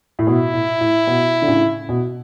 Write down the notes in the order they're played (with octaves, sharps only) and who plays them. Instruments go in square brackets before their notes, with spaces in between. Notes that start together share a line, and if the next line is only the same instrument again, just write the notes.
[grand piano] A2
[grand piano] B2 [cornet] E4
[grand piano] A2
A2
B2
D3
A2 C#3
B2